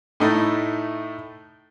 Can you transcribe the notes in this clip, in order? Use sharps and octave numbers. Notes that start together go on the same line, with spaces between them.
A2 A3 D#4 E4